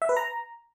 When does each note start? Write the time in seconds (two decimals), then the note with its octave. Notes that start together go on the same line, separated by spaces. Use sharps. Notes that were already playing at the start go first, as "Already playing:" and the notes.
0.02 E5
0.09 B4
0.17 A#5